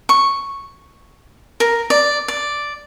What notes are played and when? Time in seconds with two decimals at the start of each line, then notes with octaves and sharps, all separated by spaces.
0.09 C#6
1.60 A#4
1.90 D5
2.28 D5